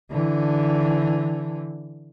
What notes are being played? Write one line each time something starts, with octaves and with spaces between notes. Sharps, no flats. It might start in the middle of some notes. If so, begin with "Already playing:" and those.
D3 E3